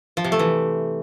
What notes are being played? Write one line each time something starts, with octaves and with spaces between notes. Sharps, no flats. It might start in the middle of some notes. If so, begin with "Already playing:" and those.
F3
C3
A3
E3